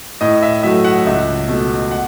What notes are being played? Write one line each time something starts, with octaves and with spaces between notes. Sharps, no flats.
A2 D#5
E5
F#3 A3 E5
F#5
C#2 E5
B2 A3
F#5